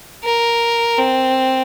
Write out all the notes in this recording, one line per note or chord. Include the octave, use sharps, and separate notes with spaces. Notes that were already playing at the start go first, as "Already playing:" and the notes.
A#4
C4